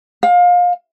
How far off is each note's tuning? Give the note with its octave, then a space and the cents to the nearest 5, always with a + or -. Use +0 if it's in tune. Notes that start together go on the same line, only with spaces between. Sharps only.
F5 +25